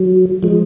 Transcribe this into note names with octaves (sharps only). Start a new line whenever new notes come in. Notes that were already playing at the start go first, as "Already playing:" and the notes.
Already playing: F#3
F3 G#3